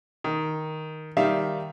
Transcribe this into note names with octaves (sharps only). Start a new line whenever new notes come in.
D#3
D#3 G3 E5 F5